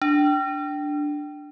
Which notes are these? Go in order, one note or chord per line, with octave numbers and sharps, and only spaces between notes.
D4